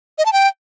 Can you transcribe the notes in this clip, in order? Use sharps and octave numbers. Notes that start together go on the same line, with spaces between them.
D#5
A5
G5